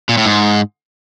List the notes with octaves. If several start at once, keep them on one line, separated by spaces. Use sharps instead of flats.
A#2
A2
G#2